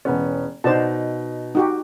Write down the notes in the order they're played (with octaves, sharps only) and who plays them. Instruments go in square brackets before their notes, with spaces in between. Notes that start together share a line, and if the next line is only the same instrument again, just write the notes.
[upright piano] E1 B3 C#4
[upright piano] B2 D#4 [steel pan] C5 D5 A5
[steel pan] D#4 F#4 G4